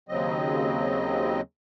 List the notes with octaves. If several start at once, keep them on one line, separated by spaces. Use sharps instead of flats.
D#2 C#3 F#3 C4 D#5